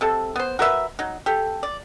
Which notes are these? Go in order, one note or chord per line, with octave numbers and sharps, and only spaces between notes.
C3 A4 A5
B3 C5
F#4 A#4 B4 E5
F#3 D#4
G4 A4
D5